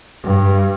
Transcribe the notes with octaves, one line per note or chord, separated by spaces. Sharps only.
G2